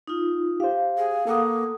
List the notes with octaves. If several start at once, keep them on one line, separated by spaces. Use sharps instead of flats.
D#4 F4
G4 C5 F5
G#4
A#3 A4 F#5 D#6